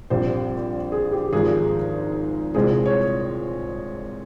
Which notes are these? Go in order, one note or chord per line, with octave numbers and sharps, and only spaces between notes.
A#1 A#2 G3 C4 C5
G#4
G4
G#1 G#2 F3 G#4
C2 A#2 G#3 C4 G#4
C#5